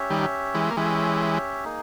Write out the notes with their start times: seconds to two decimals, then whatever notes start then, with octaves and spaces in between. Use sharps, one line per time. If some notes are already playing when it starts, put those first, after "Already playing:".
Already playing: C#4 G4 C#5 E5
0.10 D#3 G3
0.54 E3 G#3
0.71 A#3
0.77 E3 G#3 C#4 G4 C#5 E5
1.65 A#3 D#4 G#4